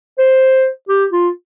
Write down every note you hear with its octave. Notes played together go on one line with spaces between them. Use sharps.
C5
G4
F4